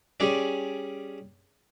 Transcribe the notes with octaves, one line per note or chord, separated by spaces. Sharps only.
G3 C#4 G#4 D5